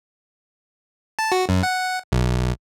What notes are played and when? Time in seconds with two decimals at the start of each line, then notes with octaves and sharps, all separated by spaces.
1.19 A5
1.32 F#4
1.49 F#2
1.63 F#5
2.12 B1